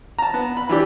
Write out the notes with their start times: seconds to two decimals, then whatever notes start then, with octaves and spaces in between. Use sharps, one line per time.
0.19 A5 A#5
0.34 B3
0.57 B5
0.69 E3 D4 G4